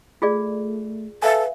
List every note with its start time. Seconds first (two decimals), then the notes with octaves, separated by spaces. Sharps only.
0.22 A3 F4 G#4 D5
1.22 A4 B4 E5 F5 G#5